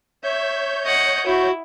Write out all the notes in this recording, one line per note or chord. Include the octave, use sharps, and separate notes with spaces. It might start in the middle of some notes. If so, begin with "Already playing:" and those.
C#5 E5 G6
D#5 F#5
E4 F#4